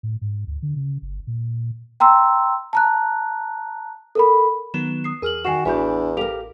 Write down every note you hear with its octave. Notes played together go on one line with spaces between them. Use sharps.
A2
G#2
D2
D3
C#3
G1
A#2
G5 A#5 C6 E6
A5 A#5 F#6
A4 A#4 B5
D#3 F#3 B3 E7
D#6 C7
E2 G#4 A#4 F6 F#7
D#3 F#4 A#4 G#5 C7 E7
A1 E2 D4 F#4 E5 G#5 B5 G6
G4 A4 A#4 F5 F7